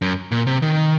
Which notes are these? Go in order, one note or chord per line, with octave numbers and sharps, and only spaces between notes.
F#2
A#2
C3
D#3